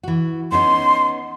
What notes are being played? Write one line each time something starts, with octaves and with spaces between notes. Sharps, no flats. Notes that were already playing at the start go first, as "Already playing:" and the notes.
E3 F#4
B3 C#4 D#4 C6